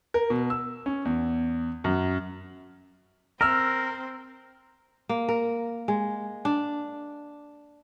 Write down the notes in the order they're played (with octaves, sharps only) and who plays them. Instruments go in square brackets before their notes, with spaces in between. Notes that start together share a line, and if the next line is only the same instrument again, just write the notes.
[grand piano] A#4
B2
E6
C#4
E2
F#2
[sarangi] C4 [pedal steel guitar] A#4 [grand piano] E6 F6
[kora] A#3
A#4
G#3
D4